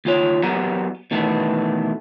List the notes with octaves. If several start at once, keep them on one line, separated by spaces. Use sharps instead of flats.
D#2 F4 C#5
F#3 B3 G4 A#4 F#5 A#5
B2 D#3 E3 A3 B3